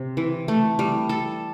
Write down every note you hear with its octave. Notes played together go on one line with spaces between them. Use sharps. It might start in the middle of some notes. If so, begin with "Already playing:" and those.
Already playing: C3 C4
E3
A3
G3
A4